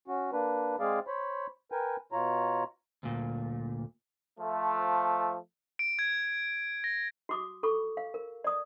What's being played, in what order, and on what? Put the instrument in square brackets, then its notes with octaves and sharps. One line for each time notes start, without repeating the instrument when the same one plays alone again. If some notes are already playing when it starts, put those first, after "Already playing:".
[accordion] C#4 F#4
A#3 D4 B4
G#3 C4 G#4 D5 F5
C5 C#5 B5
A#4 B4 G5 G#5
B2 F4 C#5 A#5
[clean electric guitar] D2 A#2
[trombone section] F3 A3
[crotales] D7
G#6
A#6
[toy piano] F#4 D6 D#6
A4 B5 C#6 D6
F5
A#4
D5 D#6